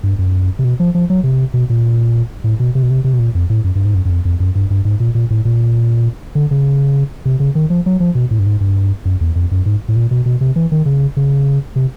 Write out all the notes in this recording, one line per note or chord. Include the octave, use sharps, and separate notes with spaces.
G2
F#2
C3
B2
F3
F3
F#3
C3
B2
A#2
A2
B2
C3
B2
C3
C3
B2
A#2
F2
A2
F#2
G2
G#2
F#2
F#2
F2
F2
F#2
G2
G2
G#2
A#2
A#2
A2
A#2
D3
C#3
C3
C#3
D#3
F3
F#3
F3
B2
A2
G2
G#2
G2
F#2
E2
F2
F#2
G#2
A2
A#2
B2
B2
C3
E3
D#3
C#3
C#3
C3